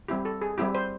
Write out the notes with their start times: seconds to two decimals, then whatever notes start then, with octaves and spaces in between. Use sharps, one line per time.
0.08 G3 C4 E4 G4
0.25 A4
0.41 G#4
0.58 G3 C4 E4 G4
0.75 C5